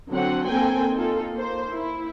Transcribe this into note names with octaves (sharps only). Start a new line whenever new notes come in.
D3 F#3 C4 C5 F#5
A#3 C4 A4 G5 G#5
D#4 F4 A4
A#3 C5
E4